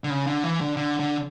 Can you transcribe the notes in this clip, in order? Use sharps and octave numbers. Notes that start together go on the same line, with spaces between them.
D3
C#3
D3
E3
D3
D3
D3